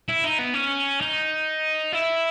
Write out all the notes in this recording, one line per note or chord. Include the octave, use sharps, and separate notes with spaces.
E4
D#4
B3
C#4
D#4
E4